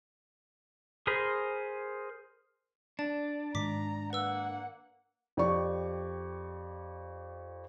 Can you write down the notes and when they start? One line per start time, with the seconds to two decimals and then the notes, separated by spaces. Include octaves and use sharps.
1.07 G#4 A#4 C5 B5
2.99 D4 A5
3.55 G#2 D#3 A#5 D6 B6
4.13 A#3 B4 F#5 E6
5.37 F2 G4 D5 C#6